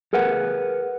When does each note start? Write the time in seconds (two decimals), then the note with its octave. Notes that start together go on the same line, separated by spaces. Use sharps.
0.13 G#4 A#4 B4 F#5